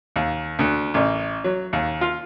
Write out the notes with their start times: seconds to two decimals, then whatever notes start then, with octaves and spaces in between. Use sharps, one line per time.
0.16 D#2
0.59 D2
0.94 A1
1.44 F#3
1.73 D#2
2.01 F4